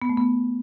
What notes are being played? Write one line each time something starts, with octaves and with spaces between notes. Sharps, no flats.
B3
A3
B3